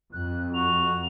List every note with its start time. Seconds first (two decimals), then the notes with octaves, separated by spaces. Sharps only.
0.13 F2 F#6
0.55 F#4 F7